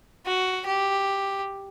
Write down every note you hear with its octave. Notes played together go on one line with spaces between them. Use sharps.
F#4
G4